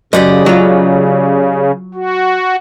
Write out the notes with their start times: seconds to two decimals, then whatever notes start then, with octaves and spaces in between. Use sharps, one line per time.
0.13 F#2 C#3 G4 D5 D#5
0.46 F#3 F4
1.94 F#4